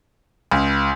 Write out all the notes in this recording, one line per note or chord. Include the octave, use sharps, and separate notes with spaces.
C#2